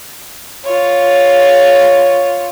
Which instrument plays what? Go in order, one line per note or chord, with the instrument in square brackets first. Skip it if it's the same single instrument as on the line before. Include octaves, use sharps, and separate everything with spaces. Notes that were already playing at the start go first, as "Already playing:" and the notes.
[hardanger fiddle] F4 C#5